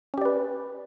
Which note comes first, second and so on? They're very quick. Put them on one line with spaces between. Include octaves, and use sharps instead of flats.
C#4 G4 D5 B4